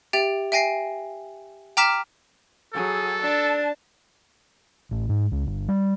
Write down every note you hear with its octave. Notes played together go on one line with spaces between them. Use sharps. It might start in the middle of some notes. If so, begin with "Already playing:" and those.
G4 E5 G5 A6
E5 G5 G#5 A#6 C7
G5 A#5 D6 F6 B6 E7
F#3 G#4 A4
D4 A5
A1
G#2
C#2
G1
G3